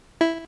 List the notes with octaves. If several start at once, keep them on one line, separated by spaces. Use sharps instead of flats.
E4